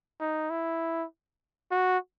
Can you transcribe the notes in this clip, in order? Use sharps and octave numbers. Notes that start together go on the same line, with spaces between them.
D#4
E4
F#4